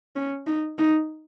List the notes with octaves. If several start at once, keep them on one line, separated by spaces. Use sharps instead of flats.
C#4
D#4
D#4